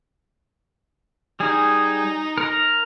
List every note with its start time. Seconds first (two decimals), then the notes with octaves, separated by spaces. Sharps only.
1.40 G3 D#4 G#4
2.38 A#4 A#5